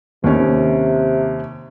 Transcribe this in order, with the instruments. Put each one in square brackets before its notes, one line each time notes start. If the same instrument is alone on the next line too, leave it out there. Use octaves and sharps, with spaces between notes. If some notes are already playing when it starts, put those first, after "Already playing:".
[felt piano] D#2 C#4 [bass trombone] C3